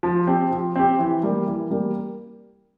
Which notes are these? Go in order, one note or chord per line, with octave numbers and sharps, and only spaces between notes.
F3
C4 G4
F3
C4 G4
E3
G3 A#3
E3
G3 A#3